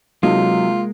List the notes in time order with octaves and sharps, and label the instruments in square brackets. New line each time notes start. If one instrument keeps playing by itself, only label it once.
[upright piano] C3 D#4 A4 [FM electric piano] F#3 [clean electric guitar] G#3 A#3 [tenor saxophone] F4